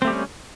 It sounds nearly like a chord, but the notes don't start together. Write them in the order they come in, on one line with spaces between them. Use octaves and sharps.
C4 A3 G4 G3 C#4